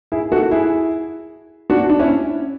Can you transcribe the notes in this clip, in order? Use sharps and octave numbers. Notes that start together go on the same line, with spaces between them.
E4 G#4
F#4 A4
E4 G#4
D4 F#4
D4
C#4 E4